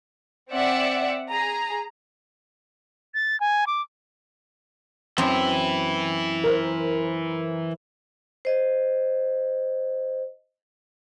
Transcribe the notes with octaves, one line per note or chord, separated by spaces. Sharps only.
C4 D5 E5 F#5
G#4 A#5
A6
G#5
D6
F#2 E3 C4 E4
A#4 C5
C5 D#5